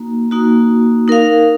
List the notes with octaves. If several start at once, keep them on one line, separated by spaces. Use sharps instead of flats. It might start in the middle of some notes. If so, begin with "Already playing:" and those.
Already playing: A#3 D#4 F#4
A#3 D#4 F#4
D#4 A#4 F5